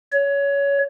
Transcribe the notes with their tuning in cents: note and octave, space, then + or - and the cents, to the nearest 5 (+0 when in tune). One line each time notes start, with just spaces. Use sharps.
C#5 +20